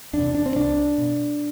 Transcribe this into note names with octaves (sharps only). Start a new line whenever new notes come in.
E2 C3 D4
D4
C4
C2 D4
B2